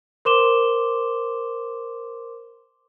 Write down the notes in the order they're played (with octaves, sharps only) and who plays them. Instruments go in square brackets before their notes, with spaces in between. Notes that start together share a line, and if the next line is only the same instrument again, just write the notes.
[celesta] A#4 C5 C6 D6 E7 G7